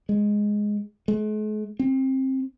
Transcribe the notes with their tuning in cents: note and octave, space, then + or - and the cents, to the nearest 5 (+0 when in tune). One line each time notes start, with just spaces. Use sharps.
G#3 +0
G#3 +45
C4 +20